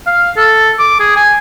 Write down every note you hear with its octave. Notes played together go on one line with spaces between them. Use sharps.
F5
A4
D6
G#4
G#5